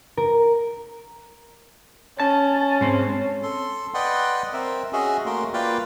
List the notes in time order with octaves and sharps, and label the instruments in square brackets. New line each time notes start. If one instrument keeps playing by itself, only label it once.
[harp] A#4
[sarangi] C#4 [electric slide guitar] A5
[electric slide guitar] G#2 C4
[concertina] A4 C6
B4 D5 D#5 F#5 G5 C6
C4 A#4 E5
C#4 F#4 G#4 D#5 E5
A3 A#3 F#4 A#4 C6
A#3 F4 B4 D5 F5 G5